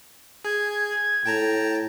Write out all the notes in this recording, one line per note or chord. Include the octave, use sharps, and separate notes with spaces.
G#4 G#6
A2 G5 A5 A#5